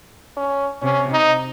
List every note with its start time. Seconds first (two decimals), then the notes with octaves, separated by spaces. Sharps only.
0.37 C#4
0.82 C3 C#4
1.12 D#4